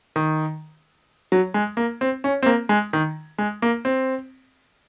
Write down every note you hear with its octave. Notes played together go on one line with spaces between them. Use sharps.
D#3
F#3
G#3
A#3
C4
C#4
C4
A#3
G#3
D#3
G#3
A#3
C4